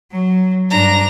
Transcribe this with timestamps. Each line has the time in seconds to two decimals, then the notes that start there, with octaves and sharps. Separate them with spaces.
0.12 F#3
0.70 G2 D4 A#5